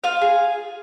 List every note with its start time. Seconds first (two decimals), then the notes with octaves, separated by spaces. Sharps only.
0.04 F4 F5
0.21 G#4